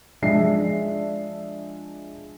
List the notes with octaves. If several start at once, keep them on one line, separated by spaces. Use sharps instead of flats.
F3 G#3 D4 D5 E5 C7